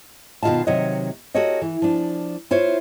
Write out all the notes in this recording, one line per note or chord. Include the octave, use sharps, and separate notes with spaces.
B2 D#3 F4 D#5 F5 A5
C3 D#3 F#3 C#5 D#5
F#4 G4 A4 A#4 C#5 D#5
E3
F3 D4
E4 F4 C5 C#5